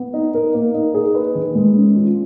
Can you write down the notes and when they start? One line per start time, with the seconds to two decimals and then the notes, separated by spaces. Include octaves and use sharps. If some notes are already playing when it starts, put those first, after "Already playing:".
Already playing: B3
0.14 D#4
0.35 A#4
0.54 A#3
0.74 D#4
0.94 G#4
1.15 B4
1.35 D#3
1.55 G#3
1.76 C#4
1.96 F4